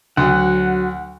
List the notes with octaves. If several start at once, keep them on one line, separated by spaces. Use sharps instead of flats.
D2 F#3 F#5